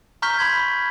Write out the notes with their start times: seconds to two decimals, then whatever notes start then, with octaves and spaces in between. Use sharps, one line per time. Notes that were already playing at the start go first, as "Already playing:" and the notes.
0.22 A#5 C#6 F6 G6 B6 G7
0.38 B5 C6 G#6 B6